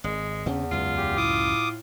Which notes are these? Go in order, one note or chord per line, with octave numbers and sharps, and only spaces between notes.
G#1 G#3
E2 C#3 C4 C#4
C#2 F#2 F4
G4
A2 D6 D#6